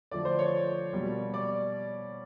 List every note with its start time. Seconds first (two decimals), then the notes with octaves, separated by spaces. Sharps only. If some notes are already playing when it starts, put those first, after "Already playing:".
0.11 D3 F3 A3 D5
0.25 C5
0.39 C#5
0.93 B2 G3 A#3
1.34 D5